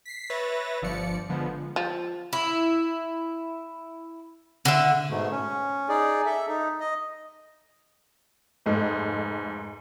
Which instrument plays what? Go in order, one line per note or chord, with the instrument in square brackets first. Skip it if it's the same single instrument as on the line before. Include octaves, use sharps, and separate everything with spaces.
[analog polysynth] B6 C7
B4 C#5 E5 A6 A#6
G1 F3 D5 C#7
D3 F3 G#3 B3
[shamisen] F3
[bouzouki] E4
D3 E5
[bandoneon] G#2 B2 A3
C#4
D#4 G#4 D5
A4 E5
D#4
D#5
[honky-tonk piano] F1 G#2 A4 D#5